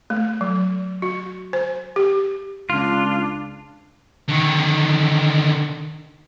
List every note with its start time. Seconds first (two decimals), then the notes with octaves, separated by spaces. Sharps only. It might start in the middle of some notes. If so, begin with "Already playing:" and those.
0.10 A3
0.41 F#3
1.02 F#4
1.53 C5
1.96 G4
2.70 C#2 D4 F4
4.29 D3 D#3